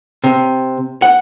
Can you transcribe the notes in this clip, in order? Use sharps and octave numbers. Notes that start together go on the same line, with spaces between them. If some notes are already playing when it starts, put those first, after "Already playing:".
C3
F#5